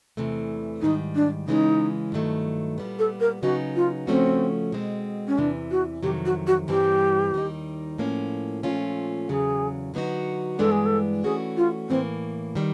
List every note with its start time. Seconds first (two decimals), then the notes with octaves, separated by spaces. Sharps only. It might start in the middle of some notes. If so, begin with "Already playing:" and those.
0.17 E2 C3 E3 A3
0.81 G#2 D#3 G3 D#4
1.15 D4
1.47 C#3 E3 G#3 C#4 D#4
2.12 G2 D#3 F#3 A3
2.78 A#2 G3 B3
2.99 A4
3.20 A#4
3.42 C#3 F#3 B3 D#4 F#4
3.76 F4
4.07 C#3 F3 A3 C4 C#4 F#4
4.72 B2 G#3 C4
5.28 C#4
5.38 E2 C3 E3 D4
5.71 F#4
6.03 F2 C3 D#3 F#3 G4
6.25 F#4
6.47 F#4
6.68 G2 E3 G3 C4 G4
7.34 D#2 D#3 G3 B3 D#4
7.98 A2 F3 A#3 C#4
8.63 A#2 F3 A3 C#4 F4
9.28 E2 C#3 F#3 G#4
9.94 D3 F#3 B3 D#4 F#4
10.58 G2 E3 G#3 B3 D4 A4
10.72 G#4
10.86 A4
11.24 E3 A3 C#4 F#4 G#4
11.57 F4
11.89 A2 E3 G3 A#3 C4
12.55 D#3 G3